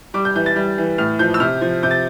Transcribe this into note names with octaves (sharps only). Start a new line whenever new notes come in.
G3 D6
G6
E3 G6
A6
G3
E3
A2 F6
F3 G6
E6
C3 F6
F3
C3 G6
A6